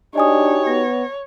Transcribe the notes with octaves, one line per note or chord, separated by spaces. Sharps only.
D4 D#4 F#4 G4 C#5 D#5 G#5 D#6
B3 A#6